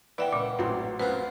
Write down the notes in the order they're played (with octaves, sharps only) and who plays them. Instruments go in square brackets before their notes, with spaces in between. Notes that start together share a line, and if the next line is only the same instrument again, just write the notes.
[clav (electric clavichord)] E3 [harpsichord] B3 [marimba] D5 E5 G5
[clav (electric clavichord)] C#2 [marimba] A#2
[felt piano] A1 F#3 C6 [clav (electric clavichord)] G#2 C4
[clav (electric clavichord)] F#2 [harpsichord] B3 C4 F4 [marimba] B4 F#6